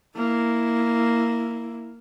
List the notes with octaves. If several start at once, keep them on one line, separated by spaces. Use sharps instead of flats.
A#3 E4